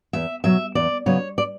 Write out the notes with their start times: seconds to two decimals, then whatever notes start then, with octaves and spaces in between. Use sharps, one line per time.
0.13 E2 E5
0.44 B2 F#3 E5
0.75 E2 D5
1.06 C#3 F#3 B3 C#5
1.38 D5